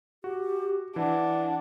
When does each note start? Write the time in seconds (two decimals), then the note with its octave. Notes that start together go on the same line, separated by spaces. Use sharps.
0.24 F#4 G4
0.96 E3 D4 F#5